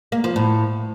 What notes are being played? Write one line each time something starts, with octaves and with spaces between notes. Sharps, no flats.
A#3
F3
A2